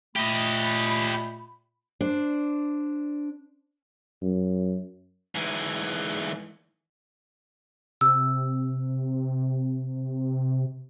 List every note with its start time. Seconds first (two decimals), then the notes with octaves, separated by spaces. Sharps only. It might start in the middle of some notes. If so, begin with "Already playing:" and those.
0.16 A#2 A3 G4 D#5 B5
2.01 D4 C5
4.22 F#2
5.35 G#2 E3
8.01 C3 E6